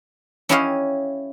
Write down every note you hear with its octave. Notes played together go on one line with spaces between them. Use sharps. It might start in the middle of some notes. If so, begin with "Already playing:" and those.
C#4 E4 G4 C#5 D#5 F5